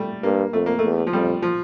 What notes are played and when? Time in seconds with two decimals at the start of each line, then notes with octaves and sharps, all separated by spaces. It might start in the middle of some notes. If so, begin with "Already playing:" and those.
Already playing: G3 A3
0.23 G2 A#3
0.53 F2 A3
0.66 A#3
0.79 E2 A3
1.07 F3
1.13 F2 G3
1.42 F3